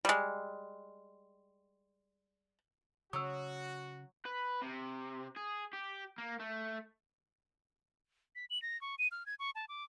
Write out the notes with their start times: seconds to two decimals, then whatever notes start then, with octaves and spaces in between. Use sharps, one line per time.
0.05 G3 G#3
3.13 C#3 F#3 F#4 D#6 E6
4.26 B4
4.62 C3
5.37 G#4
5.73 G4
6.18 A#3
6.40 A3
8.36 B6
8.50 F#7
8.62 A#6
8.81 C#6
8.99 D#7
9.11 F6
9.26 G#6
9.39 C#6
9.55 A5
9.69 D6